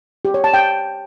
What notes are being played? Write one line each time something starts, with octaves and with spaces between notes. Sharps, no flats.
G4
C#5
A5
G5